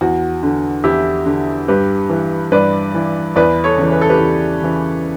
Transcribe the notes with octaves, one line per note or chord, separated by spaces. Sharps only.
E2 F#4
D3
E2 E4 G4
D3
G2 G4 B4
E3
G2 B4 D5
E3
E2 B4 D5
A4 C#5
C#3 E3
B4
A4
G4 B4
E2
C#3 E3